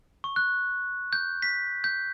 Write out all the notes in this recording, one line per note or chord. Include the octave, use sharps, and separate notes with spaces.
C#6
F#6
G6
B6
G6